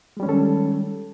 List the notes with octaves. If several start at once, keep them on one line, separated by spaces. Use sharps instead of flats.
D#3 G3 G#3 C#4 A4